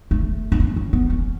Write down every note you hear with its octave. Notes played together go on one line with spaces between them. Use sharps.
A3
D4
C#4
C#4
B3
C#4